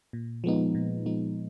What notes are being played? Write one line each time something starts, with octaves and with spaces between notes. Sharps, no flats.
A#2
F3 G#3 B3 D#4
A#2
F3 G#3 B3 D#4